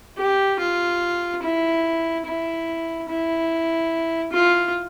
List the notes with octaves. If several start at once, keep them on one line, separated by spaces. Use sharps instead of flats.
G4
F4
E4
E4
E4
F4